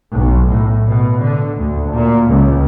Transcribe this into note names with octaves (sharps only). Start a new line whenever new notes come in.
B1
A2
B2
D3
D2
A#2
C#2